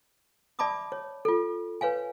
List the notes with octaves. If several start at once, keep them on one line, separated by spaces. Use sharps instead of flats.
D5 E5 A5 B5 D6 D#6
C#5
F4 A4
B4 C#5 F5 G#5